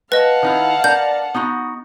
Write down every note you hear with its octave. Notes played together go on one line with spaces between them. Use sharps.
B4 D#5 F5 F#5 A5
D#3 D#4 E4
D4 A#4 D5 G6
B3 D#4 F#4